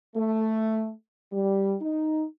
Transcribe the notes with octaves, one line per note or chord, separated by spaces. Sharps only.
A3
G3
D#4